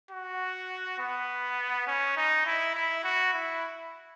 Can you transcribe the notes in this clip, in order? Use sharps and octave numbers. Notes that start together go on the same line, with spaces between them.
F#4
B3
C#4
D#4
E4
E4
F#4
E4